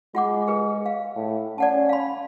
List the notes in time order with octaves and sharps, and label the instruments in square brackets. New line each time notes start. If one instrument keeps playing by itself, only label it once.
[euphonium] G#3 [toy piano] F4 F#5 D6
[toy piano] G#4 B4
F5
[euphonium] A2
[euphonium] C#4 [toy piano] D5 F#5 A5
[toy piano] F5 B5